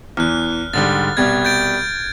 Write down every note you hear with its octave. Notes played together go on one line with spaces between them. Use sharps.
E2 E3 F6 F#6
G#2 D3 G3 A6
C2 B2 G3 G#6
G6 A6 D7